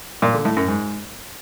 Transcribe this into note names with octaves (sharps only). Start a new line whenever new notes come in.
A#2
D3
A2
F#2
G#2